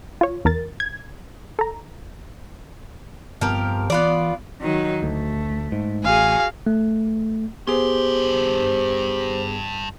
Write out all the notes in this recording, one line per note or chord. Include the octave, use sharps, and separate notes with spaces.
F4 C#5
E2 A#4 A6
G#6
A4 A#5
G2 F3 B3 C4 G4 A#4
E3 B3 F4 D5
D#3 F#3 D#4
D2 A3
G#2
A1 F#4 G#4 F5 G#5
A3
G2 B3 G4 G#4 C5 C6